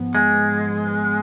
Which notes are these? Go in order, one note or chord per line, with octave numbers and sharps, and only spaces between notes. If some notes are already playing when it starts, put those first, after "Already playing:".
Already playing: G#2 F3 B3
G#3